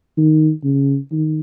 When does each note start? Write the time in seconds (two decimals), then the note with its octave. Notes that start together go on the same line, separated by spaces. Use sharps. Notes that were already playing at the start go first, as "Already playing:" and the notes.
0.18 D#3
0.64 C#3
1.12 D#3